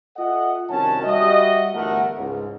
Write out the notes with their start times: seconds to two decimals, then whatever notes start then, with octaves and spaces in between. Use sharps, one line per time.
0.16 F4 A4 D#5 E5 F#5
0.69 C2 D#3 C#4 F#4 G#5 A5
1.04 G3 F#4 D#5 E5
1.73 G1 E2 A3 A#4 F#5
2.16 C#2 G#2